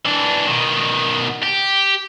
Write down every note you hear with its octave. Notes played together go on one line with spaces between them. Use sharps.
E3 D4
B2 D#3
G4